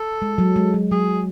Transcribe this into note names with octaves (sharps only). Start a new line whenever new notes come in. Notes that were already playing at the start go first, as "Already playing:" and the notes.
Already playing: A4
G#3
F#3
G#3
F#3
F#3 G#4